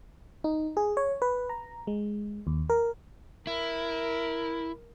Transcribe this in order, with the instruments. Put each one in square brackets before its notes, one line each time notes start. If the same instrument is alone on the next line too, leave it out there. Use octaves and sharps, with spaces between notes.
[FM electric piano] D#4
G#4
C#5
B4
A#5
G#3
D#2
A#4
[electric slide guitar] E4 [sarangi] A#4